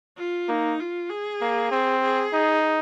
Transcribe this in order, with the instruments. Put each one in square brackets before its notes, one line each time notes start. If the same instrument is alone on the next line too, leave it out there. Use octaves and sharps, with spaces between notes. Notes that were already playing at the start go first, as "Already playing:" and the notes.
[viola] F4
[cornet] A#3 [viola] D#4
[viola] F4
G#4
[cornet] A#3
C4
[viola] G#4
[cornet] D#4